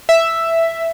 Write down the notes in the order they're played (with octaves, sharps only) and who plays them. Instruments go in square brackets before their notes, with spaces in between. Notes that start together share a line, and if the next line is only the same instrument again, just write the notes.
[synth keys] E5